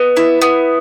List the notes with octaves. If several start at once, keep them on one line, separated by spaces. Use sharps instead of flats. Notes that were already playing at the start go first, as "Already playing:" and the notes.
Already playing: B3 D#5
E4
B3